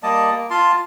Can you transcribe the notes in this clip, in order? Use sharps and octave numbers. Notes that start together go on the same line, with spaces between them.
G3 A#3 D#5 A5
A#3
F4 F5 A5 C6